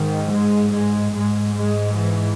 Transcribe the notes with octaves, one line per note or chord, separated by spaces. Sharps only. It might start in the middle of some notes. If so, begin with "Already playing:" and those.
Already playing: G#2 D#3
G#3
G#3
G#2 G#3
G#3
E3